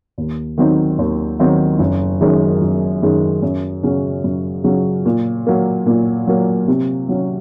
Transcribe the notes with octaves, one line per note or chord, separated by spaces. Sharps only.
D#2
D#3 F#3 C4 D#4
D#2
D#3 F#3 C4 D#4
F#1
F#2 D#3 G#3
F#1
F#2 D#3 G#3
F#2
C#3 F#3 C#4
F#2
C#3 F#3 C#4
A#2
F#3 A#3
A#2
F#3 A#3
C3
F#3 C#4